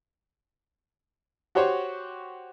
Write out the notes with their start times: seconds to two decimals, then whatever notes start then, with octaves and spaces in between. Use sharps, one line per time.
1.55 F#4 G4 C5 C#5